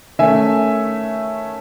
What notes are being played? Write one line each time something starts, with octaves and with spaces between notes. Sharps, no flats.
D#3 A3 C#4 E5 G#5